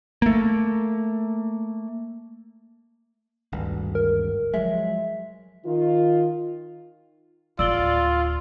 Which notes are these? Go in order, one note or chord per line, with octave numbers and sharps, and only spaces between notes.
A3 A#3
G#1 D2 G2
A#4
F3 F#3 G#3 E5
D#3 F4
D1 F4 D5 E6 G7